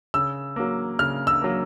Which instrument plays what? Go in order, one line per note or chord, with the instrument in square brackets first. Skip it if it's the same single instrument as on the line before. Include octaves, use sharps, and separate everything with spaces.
[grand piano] C#3 E6
F#3 A#3
C#3 F6
E6
F#3 A#3